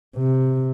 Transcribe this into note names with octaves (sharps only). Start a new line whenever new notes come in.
C3